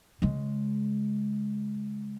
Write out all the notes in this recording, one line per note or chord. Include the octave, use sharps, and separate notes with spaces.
C#3 G#3